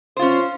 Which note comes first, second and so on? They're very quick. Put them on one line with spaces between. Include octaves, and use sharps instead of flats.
C5 F4 C#4